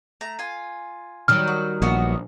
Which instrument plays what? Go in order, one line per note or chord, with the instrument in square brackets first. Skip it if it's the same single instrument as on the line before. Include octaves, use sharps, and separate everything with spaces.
[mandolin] A3 A#5
F4 G#5
[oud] D#3 F#3 G3 [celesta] F6
[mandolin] F#4
[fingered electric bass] A#1 [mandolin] B3 F#4 D#5